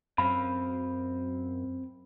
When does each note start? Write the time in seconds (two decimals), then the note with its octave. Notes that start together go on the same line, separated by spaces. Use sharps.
0.18 F#2 C4 F5 B5